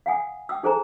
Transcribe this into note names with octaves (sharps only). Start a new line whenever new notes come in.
F5 F#5 G#5 D#6
G5 D#6 E6
D#4 G#4 A4 C5 G#5 A#5